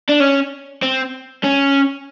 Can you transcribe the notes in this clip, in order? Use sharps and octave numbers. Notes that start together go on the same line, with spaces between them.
D4
C#4
C4
C#4